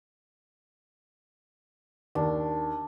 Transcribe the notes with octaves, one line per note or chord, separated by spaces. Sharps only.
D#2 D4